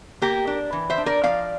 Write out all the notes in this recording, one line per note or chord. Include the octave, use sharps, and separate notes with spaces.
A#3 G4 A#4
D4
E3
C5 E5
D4
A#4 D5
F3 D5 F5